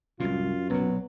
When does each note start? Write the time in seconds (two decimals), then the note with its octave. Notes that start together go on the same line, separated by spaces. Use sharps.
0.20 C2 F#2 A2 F4
0.70 B1 A#2 F#3 B3